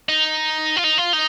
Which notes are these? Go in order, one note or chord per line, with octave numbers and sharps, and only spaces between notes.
D#4
F4
D#4
F4
D#4